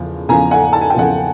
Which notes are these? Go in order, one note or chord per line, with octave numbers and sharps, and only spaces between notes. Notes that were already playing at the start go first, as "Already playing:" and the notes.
Already playing: E2 C#3 F3
E2 C#3 F3 G#5 A#5
F#5 G#5
A5
G#5
G5
E2 C#3 F3 F#5 G#5